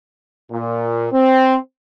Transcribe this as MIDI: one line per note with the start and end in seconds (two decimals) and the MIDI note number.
0.51 1.08 46
1.12 1.57 60